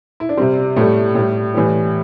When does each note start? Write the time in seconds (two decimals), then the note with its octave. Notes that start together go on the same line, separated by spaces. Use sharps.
0.20 E4
0.29 D4
0.37 C3 G3 C4
0.76 A2 G3 A3
1.15 A2 G3
1.54 A2 E3 G3